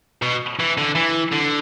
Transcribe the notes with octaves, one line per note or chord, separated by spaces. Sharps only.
B2
E3
D3
E3
D3